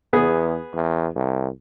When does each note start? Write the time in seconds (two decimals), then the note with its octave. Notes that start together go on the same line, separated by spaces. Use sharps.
0.13 E2 B3 G#4
0.74 E2
1.16 C2